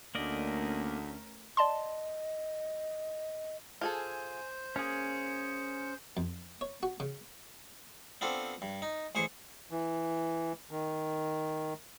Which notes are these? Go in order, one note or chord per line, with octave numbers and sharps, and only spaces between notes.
D2 A3 A#3 C#4 A#4 D5 D#5
D5 D#5 A5 C6
F4 G#4 A4 C5 G#5
A#3 C#4 G#4 C#7
F2
C#5
F#4
C#3
B3 C4 D4 F4 A4
G2
D#4
A1 G#4 C5 C#6
E3
D#3